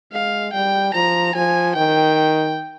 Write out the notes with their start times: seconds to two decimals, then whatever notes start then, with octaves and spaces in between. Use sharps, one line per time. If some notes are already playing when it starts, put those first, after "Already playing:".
0.12 G#3 F5
0.54 G3 G5
0.94 F3 A#5
1.35 F3 G#5
1.76 D#3 G5